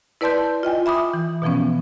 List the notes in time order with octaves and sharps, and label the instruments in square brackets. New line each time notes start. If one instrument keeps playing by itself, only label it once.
[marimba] E4 B4 D5 A5 C6 G6
F4 D#5 G5 G#5
E5 B5 D6 D#6
E3
B2 E3 F3 B3 C#4